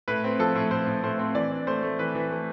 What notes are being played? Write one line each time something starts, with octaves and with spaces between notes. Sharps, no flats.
A2 B4
C4
F3 A4
A2
A2 C5
A2
A2 C5
C4
E3 D5
D4
A3 C5
A3
E3 B4
E3
A3